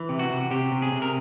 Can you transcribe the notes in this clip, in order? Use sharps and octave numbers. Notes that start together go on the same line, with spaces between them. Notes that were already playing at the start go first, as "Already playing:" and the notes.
Already playing: E3
C3
F#4
C3
C3 G4
C3
G#4
C3
A#4